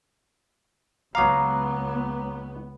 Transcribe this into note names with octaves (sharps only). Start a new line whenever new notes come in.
C#2 F#3 B3 F5 A#5 D6 D#6